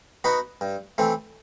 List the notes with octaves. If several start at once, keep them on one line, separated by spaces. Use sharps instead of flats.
B3 D#4 F#4 B4
G2
E3 A3 C4